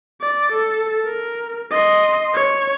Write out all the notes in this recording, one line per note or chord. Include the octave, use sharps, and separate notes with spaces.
D5
A4
A#4
D#5 C6
C#5